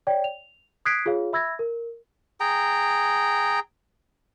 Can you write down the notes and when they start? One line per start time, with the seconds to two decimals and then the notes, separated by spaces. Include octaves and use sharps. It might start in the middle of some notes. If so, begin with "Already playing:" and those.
0.07 C#5 D5 G5
0.24 F7
0.85 D#6 F#6 G#6 B6 C7 D7
1.06 F4 G#4 C#5 F5
1.33 E5 B5 E6 G#6 A#6
1.59 A#4
2.40 G#4 G5 A#5